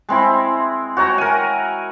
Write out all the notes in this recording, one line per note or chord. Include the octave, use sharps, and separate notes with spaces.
G#3 C4 E4
F#4 C#5 G5 A#5
A#4 G#5